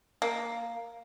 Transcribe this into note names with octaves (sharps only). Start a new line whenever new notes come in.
A#3